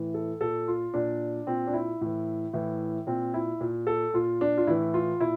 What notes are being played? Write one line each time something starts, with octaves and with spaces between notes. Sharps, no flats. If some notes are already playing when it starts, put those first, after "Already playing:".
Already playing: A2 E3
A4
A#2 A4
F4
A#2 D4
A#2 C4
D4
E4
A2 E3
A2 E3
A#2 C4
E4
A#2
A4
A#2 F4
D4
F4
A2 E3 E4
F4
A#2 E4